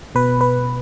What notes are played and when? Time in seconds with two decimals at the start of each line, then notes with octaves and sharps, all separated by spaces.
0.15 B2 B4
0.41 B4